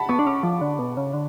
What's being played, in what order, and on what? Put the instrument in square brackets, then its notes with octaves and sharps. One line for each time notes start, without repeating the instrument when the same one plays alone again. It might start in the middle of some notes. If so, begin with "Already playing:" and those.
Already playing: [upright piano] F#5 A5 B5
[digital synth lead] B3 [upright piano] C#6
[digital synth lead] D4
[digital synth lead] C#4 [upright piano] D6
[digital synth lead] F3
D3
B2
C#3
D3